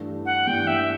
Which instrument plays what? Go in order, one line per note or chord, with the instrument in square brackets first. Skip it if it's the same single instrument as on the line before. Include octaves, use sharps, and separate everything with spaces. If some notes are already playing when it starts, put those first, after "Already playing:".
Already playing: [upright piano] G2 E3 A3 D4
[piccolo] F#5
[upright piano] G2 E3 A3 D4 [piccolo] G5
[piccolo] E5